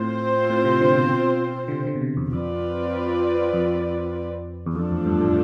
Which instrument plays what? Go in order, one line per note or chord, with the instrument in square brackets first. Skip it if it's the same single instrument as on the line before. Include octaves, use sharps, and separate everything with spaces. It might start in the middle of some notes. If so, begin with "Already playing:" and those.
Already playing: [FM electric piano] A2 [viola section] C4 F4 C5
[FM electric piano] A2
C3
D3
B2
D3
C3
D3
B2
C3
E2
[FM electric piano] F2 [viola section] C4 F4 B4 D5
[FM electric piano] F2
E2
[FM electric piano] F2 [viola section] F3 A3 D4 A4
[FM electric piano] E2
G2
A2